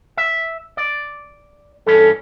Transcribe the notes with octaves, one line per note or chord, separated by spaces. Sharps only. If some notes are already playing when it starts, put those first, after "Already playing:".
E5
D5
G2 E3 C#4 A4